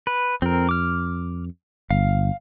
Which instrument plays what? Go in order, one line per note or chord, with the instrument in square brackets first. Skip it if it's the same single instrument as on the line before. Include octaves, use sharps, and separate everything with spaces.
[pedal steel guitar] B4
[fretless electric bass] F2 [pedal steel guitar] C4 A#4
[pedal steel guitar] D6 F6
[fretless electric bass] G1 [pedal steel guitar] F5